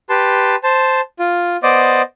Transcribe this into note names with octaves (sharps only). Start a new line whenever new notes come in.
G4 B4 A5 C6
C5 A5
F4
B3 C5 D5 D#5 D6